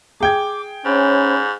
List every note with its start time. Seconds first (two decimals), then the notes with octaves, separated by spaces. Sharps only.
0.20 G#4 G5 D6 G#6
0.85 G#2 C#4 C5 C#5 B5